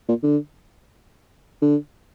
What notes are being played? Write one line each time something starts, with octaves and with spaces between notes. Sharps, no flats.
A#2
D3
D3